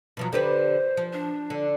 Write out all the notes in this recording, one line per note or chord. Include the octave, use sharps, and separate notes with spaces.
B2 F3 F#3
D3 G4 B4 C5
F3
D4
D3